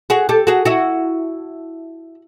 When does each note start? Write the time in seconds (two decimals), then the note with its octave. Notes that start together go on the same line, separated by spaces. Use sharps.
0.10 F#4 G#4
0.29 G4 A4
0.47 F#4 G#4
0.66 E4 F#4